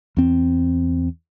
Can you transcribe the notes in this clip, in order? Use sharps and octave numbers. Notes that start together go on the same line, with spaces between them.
E2 C4